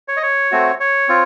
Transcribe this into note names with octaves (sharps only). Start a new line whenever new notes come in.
C#5
D#5
C#5
A3 C4 F#4
C#5
C4 F4